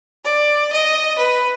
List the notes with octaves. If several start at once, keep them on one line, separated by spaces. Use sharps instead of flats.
D5
D#5
B4